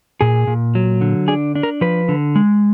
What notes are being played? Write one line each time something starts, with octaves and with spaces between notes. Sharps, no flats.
A#2 G#4
A#2
F#3
D3
D4 G#4
D4
A#4
F3 B4
D3
G#3